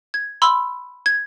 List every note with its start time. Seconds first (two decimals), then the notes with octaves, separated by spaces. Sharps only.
0.14 G#6
0.42 B5 C6 E6
1.06 G#6